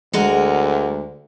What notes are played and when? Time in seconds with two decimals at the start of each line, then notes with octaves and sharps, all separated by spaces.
0.13 D2 G#3 F#4 A#4